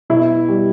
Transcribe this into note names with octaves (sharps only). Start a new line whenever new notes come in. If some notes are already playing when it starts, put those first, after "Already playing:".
B2 E4
G3